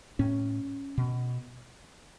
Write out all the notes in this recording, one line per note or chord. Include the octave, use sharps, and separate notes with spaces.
A2 C#4
B2